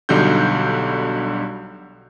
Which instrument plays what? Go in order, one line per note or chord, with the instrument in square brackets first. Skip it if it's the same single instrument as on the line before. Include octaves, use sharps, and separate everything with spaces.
[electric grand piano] B1 D3 G3 D#4 F#4 G6